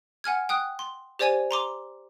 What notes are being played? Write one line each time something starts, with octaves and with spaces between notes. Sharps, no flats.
F#5 G#5 F6 G#6
G5 D#6 F#6
C6
G4 C5 D5 G#5 G#6 D#7
A#5 C6 D6